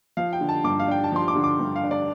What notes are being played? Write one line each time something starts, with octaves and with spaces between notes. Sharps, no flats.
F3 F5
G5
D3
A5
G2 D6
F5
D4 G5
A5
F3 C6
D6
D3
D6
G2
F5
D4
D5